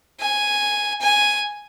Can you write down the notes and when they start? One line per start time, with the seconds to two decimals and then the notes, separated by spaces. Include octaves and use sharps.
0.20 G#5
1.01 G#5